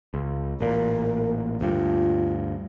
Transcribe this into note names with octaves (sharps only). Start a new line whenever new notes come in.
C#2
A1 A#2 A#4
D2 G2 F4